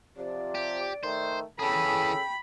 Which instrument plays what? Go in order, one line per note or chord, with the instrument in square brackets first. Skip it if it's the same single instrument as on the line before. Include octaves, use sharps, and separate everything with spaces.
[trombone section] C3 F3 [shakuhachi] D5
[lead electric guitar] G4
[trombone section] D#3 A3 [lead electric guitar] C5
[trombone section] C#3 A4 [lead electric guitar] E3 G#4 [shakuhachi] G5 [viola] B5